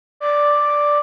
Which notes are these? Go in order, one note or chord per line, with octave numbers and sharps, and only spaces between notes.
D5